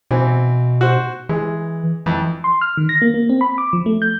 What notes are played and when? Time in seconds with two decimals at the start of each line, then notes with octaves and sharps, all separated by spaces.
0.11 B2 E3 C4
0.81 F#4 C5
1.29 E3 G#3
2.06 F2 E3
2.44 C6
2.61 F6
2.77 D#3
2.89 A#6
3.02 A#3
3.14 A#3
3.29 C4
3.41 B5
3.58 D6
3.73 F3
3.86 A3
4.02 G6